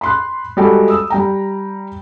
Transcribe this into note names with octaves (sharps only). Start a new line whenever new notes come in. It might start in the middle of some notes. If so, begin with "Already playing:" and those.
B5 C6 F#6
G3 G#3 F#4 G4 A4
D#6 E6
G3 G5 A#5